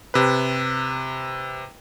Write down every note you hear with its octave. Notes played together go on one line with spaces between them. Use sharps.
C3 B4